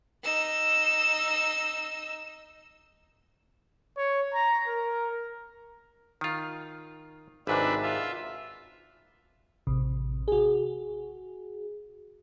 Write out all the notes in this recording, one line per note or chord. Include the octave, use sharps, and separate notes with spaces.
D#4 E6
C#5
A#5
A#4
D#3 F4
G#1 G#2 C3 D4 B4 E5
F4 E5
A1 C3
F#4 G#4